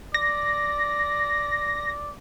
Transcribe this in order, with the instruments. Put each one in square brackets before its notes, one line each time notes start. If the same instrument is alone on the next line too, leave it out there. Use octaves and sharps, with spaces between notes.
[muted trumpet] D5 [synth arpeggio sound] A#6